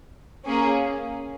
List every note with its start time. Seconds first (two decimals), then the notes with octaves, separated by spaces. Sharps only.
0.45 A#3 C#4 G#4